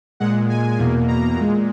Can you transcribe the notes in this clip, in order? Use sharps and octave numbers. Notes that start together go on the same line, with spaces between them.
A#2 G#3 F#5
G#5
E2 B2 A#3
A#5
A#2 G#3